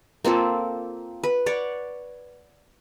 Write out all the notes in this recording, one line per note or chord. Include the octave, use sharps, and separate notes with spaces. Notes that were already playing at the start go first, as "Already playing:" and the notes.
A#3 C4 F4 A4
B4
C#5 D5 F#5